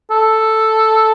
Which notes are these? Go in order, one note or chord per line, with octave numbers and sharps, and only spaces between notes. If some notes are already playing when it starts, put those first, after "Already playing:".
A4